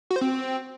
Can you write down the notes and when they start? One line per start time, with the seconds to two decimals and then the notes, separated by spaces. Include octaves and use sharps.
0.11 F#4
0.16 C5
0.21 C4